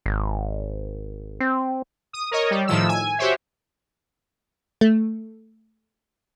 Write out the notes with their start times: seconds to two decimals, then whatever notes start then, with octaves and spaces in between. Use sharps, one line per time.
0.06 G#1
1.40 C4
2.13 D#6
2.31 A#4 C#5 D#5
2.51 G3
2.67 A2 D#3 F3 E6
2.89 G#5
3.18 F#4 G4 C5 C#5 E5
4.81 A3